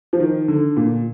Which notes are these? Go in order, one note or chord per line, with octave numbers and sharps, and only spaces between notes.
F3
D#3
D3
A#2